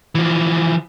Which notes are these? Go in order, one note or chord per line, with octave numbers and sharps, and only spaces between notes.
E3 F3